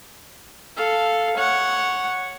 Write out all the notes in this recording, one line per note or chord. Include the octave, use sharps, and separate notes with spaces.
A4 F5
C#5 F#5